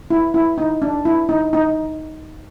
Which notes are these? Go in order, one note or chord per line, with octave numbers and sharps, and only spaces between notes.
E4
E4
D#4
D4
E4
D#4
D#4